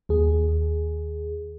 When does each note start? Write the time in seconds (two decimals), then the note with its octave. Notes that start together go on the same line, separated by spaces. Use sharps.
0.09 D#2 G#4